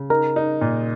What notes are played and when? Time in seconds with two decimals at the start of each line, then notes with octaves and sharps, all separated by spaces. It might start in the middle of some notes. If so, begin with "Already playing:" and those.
Already playing: C#3
0.10 D#4 A#4
0.36 D#4
0.61 A#2